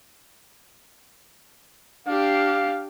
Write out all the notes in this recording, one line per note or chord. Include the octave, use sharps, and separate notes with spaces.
D4 G4 F5